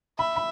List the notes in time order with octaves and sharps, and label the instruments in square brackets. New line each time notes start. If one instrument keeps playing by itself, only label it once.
[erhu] E5 [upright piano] B5
[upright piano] B5